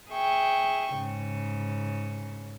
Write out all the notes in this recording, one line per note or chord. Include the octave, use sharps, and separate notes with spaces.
G#4 E5 G5 C#6
G#2 C#3